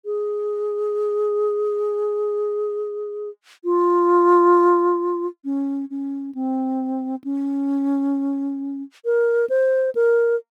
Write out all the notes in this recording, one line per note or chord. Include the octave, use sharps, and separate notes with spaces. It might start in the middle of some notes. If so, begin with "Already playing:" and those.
G#4
F4
C#4
C#4
C4
C#4
A#4
C5
A#4